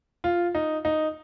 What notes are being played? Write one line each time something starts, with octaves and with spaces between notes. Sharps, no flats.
F4
D#4
D#4